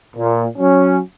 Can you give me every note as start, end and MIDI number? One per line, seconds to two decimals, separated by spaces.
0.16 0.45 46
0.58 0.99 54
0.58 0.99 61